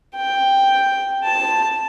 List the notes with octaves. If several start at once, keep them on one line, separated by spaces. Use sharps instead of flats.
G5
A5